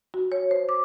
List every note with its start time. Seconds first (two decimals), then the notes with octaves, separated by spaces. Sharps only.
0.14 F#4
0.32 C#5
0.51 C5
0.69 D6